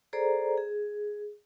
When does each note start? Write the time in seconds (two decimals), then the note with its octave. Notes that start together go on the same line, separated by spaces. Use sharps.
0.13 G#4 A4 C5 D5 A#5
0.58 G#4